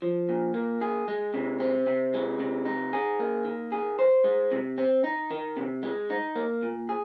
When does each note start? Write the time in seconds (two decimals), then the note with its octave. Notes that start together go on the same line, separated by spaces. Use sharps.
0.02 F3
0.29 A#2
0.54 A#3
0.81 G#4
1.08 G#3
1.34 C3
1.60 C4
1.87 C3
2.14 G#3
2.40 C3
2.65 D#4
2.93 G#4
3.19 A#3
3.45 D#3
3.72 G#4
3.99 C5
4.24 G#3
4.52 C3
4.78 C4
5.04 D#4
5.31 D#3
5.57 C3
5.83 G#3
6.10 D#4
6.35 A#3
6.62 A#2
6.89 G#4